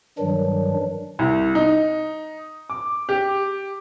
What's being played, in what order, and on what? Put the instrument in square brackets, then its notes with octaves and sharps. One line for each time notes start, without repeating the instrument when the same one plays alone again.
[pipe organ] G2 D#3 E3 F#3 G3 D4
[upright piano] C2
D#4
D6
G4